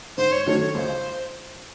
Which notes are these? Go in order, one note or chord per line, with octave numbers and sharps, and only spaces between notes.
G#2 C5
C#5
D#3 F#3 A3 C#5
C#5
C#2 C5